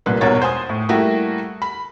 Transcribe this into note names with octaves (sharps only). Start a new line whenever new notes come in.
C2 A#2 B4
E2 G#2 B2 A#4 C#5 A6
C5 F#5 G#5 D#6
A2
G3 A3 A#3 E4 F#4 G4
B5